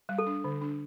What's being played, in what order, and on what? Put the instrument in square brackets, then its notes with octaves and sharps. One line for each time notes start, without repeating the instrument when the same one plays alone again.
[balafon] G3
[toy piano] A4
[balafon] D4
D3
D4